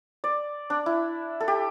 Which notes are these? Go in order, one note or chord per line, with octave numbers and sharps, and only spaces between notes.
D5
D4
E4
A4
G4